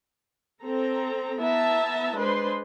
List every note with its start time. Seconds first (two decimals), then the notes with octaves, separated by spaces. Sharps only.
0.62 C4 A4 A#5
1.41 B3 E4 E5 A5 A#5
2.16 G#3 D4 B4 C5 C6